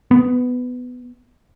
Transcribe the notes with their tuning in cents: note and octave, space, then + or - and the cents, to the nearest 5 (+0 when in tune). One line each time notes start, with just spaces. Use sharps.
B3 +10